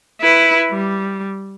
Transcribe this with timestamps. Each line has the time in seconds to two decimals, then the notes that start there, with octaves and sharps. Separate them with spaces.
0.21 E4 B4
0.70 G3